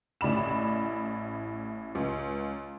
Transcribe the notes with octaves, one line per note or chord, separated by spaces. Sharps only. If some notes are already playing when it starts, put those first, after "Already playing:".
A1 A2 D5 B5 E7
C#2